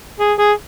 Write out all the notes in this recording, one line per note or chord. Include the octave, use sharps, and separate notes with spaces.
G#4
G#4